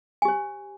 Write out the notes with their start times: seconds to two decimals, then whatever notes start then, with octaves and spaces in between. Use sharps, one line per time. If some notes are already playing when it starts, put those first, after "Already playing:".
0.22 G#5
0.25 G4
0.28 C5